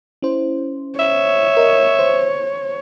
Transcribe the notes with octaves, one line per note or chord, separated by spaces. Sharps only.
C#4 E4 C5
C#5 E5
A#4 D#5
C5